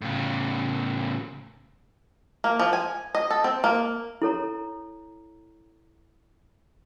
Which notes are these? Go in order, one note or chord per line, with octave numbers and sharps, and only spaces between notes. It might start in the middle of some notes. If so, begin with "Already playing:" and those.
A2 C#3
A#3
F3
G#5
D#5
A4
C4
A#3
E4 A4 C#5 A#5